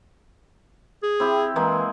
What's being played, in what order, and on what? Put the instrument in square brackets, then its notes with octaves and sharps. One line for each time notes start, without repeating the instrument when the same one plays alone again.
[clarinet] G#4
[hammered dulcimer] C4 E4 G4
[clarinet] E3 [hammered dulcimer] G#3 A#3